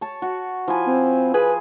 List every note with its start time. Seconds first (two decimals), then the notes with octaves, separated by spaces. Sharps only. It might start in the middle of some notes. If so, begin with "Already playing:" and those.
0.01 C#5 A5
0.22 F#4
0.68 F3 E4 G#5
0.87 C4
1.34 G#4 B4 G#5